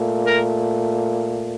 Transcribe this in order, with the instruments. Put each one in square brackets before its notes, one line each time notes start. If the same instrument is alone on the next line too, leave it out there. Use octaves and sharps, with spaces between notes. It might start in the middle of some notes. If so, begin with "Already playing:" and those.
Already playing: [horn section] A#2 A3
A#4